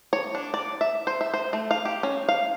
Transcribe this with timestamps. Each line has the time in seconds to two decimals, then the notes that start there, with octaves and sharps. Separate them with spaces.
0.13 C#5
0.35 D4
0.54 D5
0.81 E5
1.07 C5
1.21 E5
1.34 C5
1.53 A3
1.71 F5
1.85 G4
2.03 C#4
2.29 F5